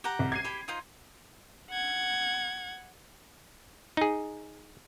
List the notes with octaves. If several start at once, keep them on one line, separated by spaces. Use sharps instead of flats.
G4 F#5 A#5
C2
G#6 C7 D#7
G4 B5
D#4 F4 C5
F#5 G#6
D#4 G#4